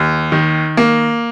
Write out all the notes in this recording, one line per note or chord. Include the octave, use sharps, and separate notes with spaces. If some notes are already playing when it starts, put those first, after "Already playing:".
Already playing: D#2
D#3
A#3